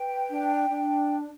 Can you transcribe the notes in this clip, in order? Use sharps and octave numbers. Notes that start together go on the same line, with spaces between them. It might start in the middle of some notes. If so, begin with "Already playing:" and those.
Already playing: B4 G5
D4
D4